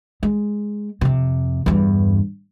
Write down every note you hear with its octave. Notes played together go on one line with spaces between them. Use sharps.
G#3
F2 C3
E2 G2